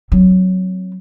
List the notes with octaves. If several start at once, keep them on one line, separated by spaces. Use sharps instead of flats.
F#3 C4